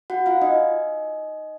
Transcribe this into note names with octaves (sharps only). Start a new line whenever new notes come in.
F#4 F#5
F4 F5
D#4 D#5